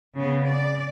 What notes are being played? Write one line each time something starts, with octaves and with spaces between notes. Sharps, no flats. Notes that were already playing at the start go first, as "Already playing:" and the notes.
C#3 B3
D5